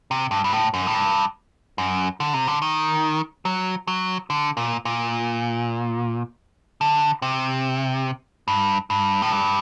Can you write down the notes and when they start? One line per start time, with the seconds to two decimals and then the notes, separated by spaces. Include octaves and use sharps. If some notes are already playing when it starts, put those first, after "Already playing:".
0.11 C3
0.31 G2
0.44 G2
0.53 A2
0.74 F#2
0.87 A2
0.94 G2
1.78 F#2
2.20 D3
2.34 C3
2.47 D3
2.62 D#3
3.45 F#3
3.88 F#3
4.30 D3
4.57 A#2
4.85 A#2
6.81 D3
7.22 C3
8.48 G2
8.90 G2
9.22 A2
9.32 G2